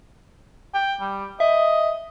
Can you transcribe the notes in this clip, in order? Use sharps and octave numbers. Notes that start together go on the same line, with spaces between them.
G5
G3
D#5 E5